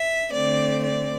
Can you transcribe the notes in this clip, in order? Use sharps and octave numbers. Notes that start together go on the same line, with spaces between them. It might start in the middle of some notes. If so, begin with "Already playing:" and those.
Already playing: E5
D3 A3 C4 D5
D5